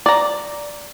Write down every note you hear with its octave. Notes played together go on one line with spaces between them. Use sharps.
D5 A#5